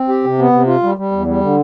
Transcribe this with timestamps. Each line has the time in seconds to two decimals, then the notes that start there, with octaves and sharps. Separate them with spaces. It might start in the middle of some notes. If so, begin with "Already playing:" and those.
Already playing: C4
0.09 G4
0.24 C3
0.39 B3
0.52 C3
0.67 F4
0.83 G3
0.97 G3
1.12 E2
1.27 G3
1.42 D3